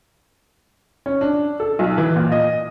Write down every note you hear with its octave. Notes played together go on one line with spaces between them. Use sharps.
C#4
D4
A4
B1
E3
A#2
D#5